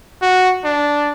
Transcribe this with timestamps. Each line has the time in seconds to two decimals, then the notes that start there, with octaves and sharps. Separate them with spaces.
0.22 F#4
0.64 D4